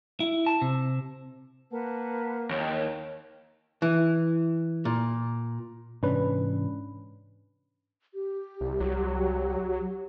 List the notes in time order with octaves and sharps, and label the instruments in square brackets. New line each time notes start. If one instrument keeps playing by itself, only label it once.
[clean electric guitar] E4
A5
C3
[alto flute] A#3 [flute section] B4 F#5 A5
[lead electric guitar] D#2 [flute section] A#4 C#5
[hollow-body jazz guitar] E3
A#2
[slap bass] G#2 C3 E3 [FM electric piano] C#4 D4 B4
[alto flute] G4
[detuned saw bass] C2
[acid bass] C2 [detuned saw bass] F#3